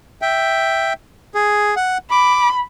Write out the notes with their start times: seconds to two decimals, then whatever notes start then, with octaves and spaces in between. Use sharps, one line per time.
0.22 E5 G5
1.34 G#4
1.76 F#5
2.11 B5 D6